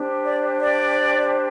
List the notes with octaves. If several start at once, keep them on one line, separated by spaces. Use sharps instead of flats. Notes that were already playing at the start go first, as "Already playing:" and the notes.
Already playing: D4 G4 C5
D5
D5